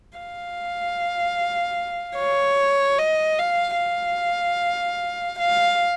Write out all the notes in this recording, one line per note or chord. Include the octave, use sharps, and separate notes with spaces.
F5
C#5
D#5
F5
F5
F5